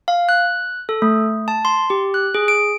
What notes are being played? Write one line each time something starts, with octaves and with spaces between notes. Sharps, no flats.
F5
F#6
A4
A3
A5
C6
G4
F#6
G#4
D7